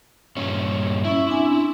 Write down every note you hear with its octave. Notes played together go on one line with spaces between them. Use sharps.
G2 A#2 C#4
C#4 E4 E5
C4 D4 G#5